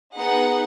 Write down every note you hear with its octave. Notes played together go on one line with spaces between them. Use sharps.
B3 D#4 G#4 F#5